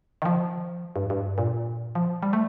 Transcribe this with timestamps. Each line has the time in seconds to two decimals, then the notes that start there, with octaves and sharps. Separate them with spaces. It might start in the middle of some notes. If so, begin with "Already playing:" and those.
0.22 D#3
0.26 F3
0.96 G2
1.10 G2
1.38 A#2
1.95 F3
2.23 G3
2.33 A3